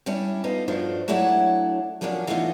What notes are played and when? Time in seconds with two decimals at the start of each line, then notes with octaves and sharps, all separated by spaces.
0.06 G3 C#4 D4 E4
0.44 B3 D#4 F4 A4
0.68 G2 F3 F#3 A3 D4
1.08 F#3 A3 D4 E4 C#5 F#5
2.01 F3 F#3 A#3 C#4 D4
2.27 E3 G3 A3 B3 D#4 F4